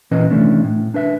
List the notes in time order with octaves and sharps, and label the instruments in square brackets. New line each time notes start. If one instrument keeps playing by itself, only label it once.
[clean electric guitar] A#2 E3 C#4 B4 D#5
C3 E3 A3 C#4 D4
A2
D4 B4 E5